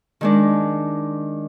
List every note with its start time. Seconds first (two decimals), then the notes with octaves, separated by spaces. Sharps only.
0.21 D#3 G#3 D4